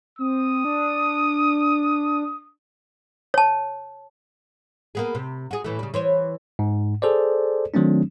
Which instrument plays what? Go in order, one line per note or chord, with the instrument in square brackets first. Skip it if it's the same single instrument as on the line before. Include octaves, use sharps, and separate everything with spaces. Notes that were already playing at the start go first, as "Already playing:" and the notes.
[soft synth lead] C4 [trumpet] D#6
[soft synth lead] D4
[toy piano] C#5 A5
[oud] A#3 B3 G#4
C3
F#4 G#4
A2 E3 A3
C#3 G3
E3 C5 C#5
[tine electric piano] G#2
G#4 A4 C5 D5
D#3 F#3 A3 C4 D4